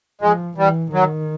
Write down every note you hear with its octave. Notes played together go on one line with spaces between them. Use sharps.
F3 G#3
E3 G3
D#3 F#3